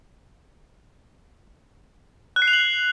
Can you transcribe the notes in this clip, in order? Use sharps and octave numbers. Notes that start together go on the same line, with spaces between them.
F#6
C7
F7
F#7